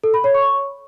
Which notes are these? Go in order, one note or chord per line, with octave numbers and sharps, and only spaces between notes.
A4
B5
C#5
C#6